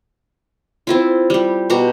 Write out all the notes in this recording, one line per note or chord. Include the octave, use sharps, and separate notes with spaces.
C4 E4 F4
G3 G4
B2 F#4 G4 A#5